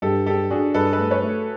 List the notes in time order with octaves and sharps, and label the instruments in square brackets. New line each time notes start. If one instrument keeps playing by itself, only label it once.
[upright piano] G2 [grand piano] G4 A4
[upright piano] D4 [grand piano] G4 A4
[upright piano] D4 [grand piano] F#4 G#4
[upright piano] G2 [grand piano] A4 B4
[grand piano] A4 B4
[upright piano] A3
[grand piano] B4 C#5
[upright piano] A3